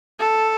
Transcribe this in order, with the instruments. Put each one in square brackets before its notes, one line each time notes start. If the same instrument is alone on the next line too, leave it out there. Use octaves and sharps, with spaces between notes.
[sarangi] A4